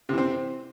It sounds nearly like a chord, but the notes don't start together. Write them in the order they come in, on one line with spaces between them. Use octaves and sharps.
C3 E3 C4